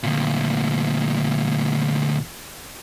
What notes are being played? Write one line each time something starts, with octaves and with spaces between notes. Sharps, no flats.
D2 A#2